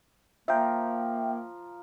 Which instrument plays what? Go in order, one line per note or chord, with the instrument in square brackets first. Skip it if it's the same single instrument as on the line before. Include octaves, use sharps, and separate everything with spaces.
[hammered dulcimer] F3 A#4 [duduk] A#3 [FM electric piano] E5 G5